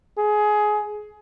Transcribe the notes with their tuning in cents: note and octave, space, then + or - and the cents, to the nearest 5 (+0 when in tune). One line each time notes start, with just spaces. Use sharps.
G#4 +20